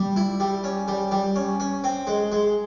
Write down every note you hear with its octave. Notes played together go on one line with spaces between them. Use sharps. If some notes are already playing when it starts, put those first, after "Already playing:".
Already playing: G3
E4
G3
C#4
G3
G3
C#4
C#4
C4
G#3
G#3